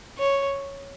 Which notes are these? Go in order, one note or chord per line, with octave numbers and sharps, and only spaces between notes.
C#5